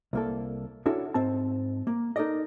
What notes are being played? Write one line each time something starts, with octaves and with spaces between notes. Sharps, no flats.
C2 A#3 A4
C#4 D4 E4 F#4 A4
G#2 C4 A5
A#3
D#4 A4 A#4 D5 D#5